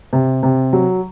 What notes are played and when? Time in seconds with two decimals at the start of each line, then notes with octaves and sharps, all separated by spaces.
0.13 C3
0.43 C3
0.73 F#3